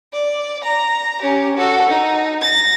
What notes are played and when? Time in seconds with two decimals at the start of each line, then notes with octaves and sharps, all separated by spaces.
0.13 D5
0.64 A#5
1.22 C#4 G4
1.57 F#4 A4
1.88 D#4
2.42 A6 A#6